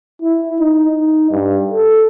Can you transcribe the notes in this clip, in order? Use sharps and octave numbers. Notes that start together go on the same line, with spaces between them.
E4
D#4
D#4
G2
A4